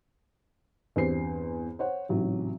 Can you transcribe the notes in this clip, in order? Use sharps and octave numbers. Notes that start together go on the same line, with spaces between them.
E2 G2 C4 G4 C5 C7
C5 C#5 F#5
A1 G#2 C3 F#3